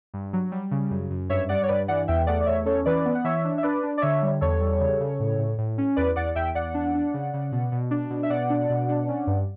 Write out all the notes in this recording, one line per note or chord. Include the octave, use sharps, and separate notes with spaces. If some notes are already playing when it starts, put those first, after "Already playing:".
G2
F#3
G3
C#3
F#2
F#2
G2 C#5 E5
G3 D5 F#5
C#5
G2 B4 D5
E3 D5 F#5
E2 E5 G5
A3 D5 F#5
D5
E2 C#5 E5
C#4 A4 C#5
E3 B4 D5
B3
F#5
E3 C#5 E5
D4
E5
D4 B4 D5
D4
D5
D3 C#5 E5
G3
E2 A4 C#5
G3
C#3
C#3
A2
A2
A2
C#4
E2 B4 D5
E2 D5 F#5
E2 E5 G5
E2 D5 F#5
D4
D4
C#3
C#3
B2
B2
D4
B2
E5
B2 D5 F#5
D4
B2
D4
C#4
G2